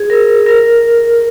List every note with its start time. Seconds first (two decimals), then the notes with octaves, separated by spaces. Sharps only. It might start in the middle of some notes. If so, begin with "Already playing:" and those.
Already playing: G#4
0.10 A#4
0.46 A#4